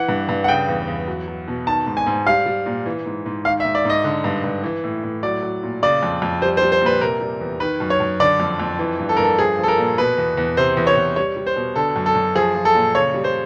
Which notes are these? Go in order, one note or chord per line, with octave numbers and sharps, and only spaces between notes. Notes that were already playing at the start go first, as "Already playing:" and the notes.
Already playing: E3 F#5
G2
G2
F#5
C#3 G5
E2
E2
F#3
F#3
B2
D#3 A5
G#2
G#5
G#2
G3 F5
G3
A#2
E3
G#2
G#2
D#3 F5
E5
G#2
D5
G#2 D#5
D3
G2
G2
E3
A2
A2
F#3 D5
F#3
A#2
C#3 D5
F2
F2
G3 C5
C5
G3
C5
A#2 B4
C3 A#4
G3
E2
D#3 B4
F#2
C#5
F#2
D3 D5
F2
F2
E3
G2
A4
G2 A#4
A4
F3 G#4
F3 A4
A#4
A#2
B2 B4
E2
E2
C3 C5
E2
C#5
E2
G3 C#5
G3
C5
B2
D3 A4
F#2
A4
F#2
F3 G#4
F3
A4
A#2
C#3 C#5
G3
C5